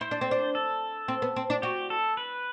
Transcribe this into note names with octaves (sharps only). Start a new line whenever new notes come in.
E4 C5
D4
C4
D4
A4
C4
B3
C4
D4
F#4 G4
A4
B4